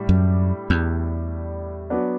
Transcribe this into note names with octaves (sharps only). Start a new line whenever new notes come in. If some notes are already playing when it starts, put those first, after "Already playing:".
Already playing: A2 G3 D4
F#2
E2
F#3 B3 D4